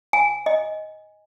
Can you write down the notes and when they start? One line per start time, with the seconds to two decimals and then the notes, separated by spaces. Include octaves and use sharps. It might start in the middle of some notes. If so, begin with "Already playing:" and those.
0.13 G#5
0.46 D#5